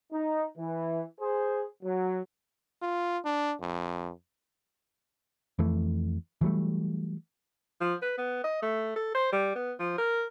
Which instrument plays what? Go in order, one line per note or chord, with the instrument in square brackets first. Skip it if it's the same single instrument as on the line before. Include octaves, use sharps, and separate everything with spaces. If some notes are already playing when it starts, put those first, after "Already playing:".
[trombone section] D#4
E3
G#4 C5
F#3
[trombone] F4
D4
F2
[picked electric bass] F2 E3 A3
E3 F#3 G3 A3
[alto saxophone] F3
B4
B3
D#5
A3
A4
C5
G3
B3
F3
A#4